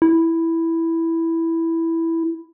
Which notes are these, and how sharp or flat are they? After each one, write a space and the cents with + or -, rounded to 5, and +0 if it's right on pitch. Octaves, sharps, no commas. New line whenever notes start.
E4 +0